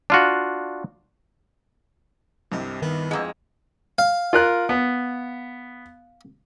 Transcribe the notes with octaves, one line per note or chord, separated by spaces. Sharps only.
D4 F4 F#4
C2 G2 C3 D#5
D#3 B3
F2 G#3 F#5 A#5 E6
F5
F4 A#4 F#6
B3